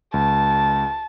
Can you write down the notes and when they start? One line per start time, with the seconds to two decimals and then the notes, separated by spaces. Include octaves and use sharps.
0.14 C#2 A5